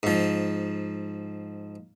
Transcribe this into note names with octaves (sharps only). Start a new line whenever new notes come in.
G#2 F3